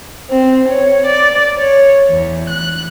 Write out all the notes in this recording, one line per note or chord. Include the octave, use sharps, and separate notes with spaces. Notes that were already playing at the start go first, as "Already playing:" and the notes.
C4
C#5
D5
C#5
E2
F#6